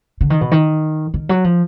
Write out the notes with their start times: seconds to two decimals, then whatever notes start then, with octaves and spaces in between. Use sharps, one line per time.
0.21 D3
0.30 D#3
0.41 B2
0.52 D#3
1.14 D#3
1.29 F#3
1.44 F3